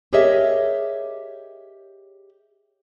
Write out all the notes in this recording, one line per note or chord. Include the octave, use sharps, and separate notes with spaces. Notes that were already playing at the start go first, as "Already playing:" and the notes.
G4 G#4 A#4 C#5 D#5 E5